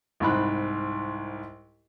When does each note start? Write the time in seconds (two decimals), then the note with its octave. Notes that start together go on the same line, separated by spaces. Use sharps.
0.20 C2 G#2 B5 F#6